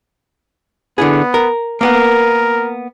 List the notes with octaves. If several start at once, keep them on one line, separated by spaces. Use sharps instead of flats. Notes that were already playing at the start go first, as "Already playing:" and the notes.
D3 B3 E4 G#4
A#4
A#3 B3 A#4 F#5